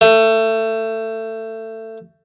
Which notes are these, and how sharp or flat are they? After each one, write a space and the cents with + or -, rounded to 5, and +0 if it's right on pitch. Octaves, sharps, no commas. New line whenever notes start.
A3 +20